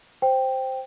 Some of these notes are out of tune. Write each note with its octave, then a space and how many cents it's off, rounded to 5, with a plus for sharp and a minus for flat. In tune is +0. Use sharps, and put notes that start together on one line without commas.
C5 +0 G5 +0